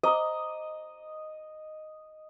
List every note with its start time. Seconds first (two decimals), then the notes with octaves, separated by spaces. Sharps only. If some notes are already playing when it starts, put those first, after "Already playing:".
0.03 C5 D#5 A#5 D#6